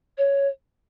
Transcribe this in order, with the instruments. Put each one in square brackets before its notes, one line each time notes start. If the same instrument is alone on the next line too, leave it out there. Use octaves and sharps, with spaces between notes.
[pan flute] C#5